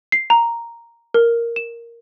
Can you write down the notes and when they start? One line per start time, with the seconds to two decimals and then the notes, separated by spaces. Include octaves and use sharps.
0.12 C7
0.30 A#5
1.14 A#4
1.56 E7